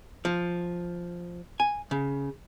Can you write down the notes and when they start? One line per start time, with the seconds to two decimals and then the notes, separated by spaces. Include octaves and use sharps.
0.25 F3
1.60 G#5
1.91 C#3